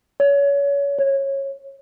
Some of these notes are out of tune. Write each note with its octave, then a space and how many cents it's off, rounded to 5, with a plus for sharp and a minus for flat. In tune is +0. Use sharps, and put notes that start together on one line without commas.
C#5 +30
C#5 -20